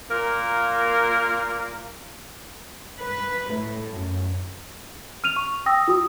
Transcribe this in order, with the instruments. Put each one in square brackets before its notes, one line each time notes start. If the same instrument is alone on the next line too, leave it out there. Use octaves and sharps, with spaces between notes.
[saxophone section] A#2 A#3 A#4
[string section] B4
A2
F#2
[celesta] F6 D#7 F7
C#6
G5 D#6 E6 A#6
F4 F#4 D#6